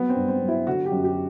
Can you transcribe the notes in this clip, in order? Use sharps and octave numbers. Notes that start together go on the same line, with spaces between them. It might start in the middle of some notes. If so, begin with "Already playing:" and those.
Already playing: F#3 B3
C4
G2
C4
F#3
E4
D3 F#4
G4
F#2
G4